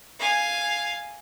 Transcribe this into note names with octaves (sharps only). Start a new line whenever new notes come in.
F5 G#5